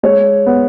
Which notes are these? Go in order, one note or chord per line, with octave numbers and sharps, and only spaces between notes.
G#3 C#5
B3